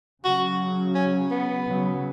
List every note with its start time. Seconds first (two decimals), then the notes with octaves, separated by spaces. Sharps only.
0.24 C#3 F#3 F#4
0.95 C#4
1.31 B3
1.67 C#3 F#3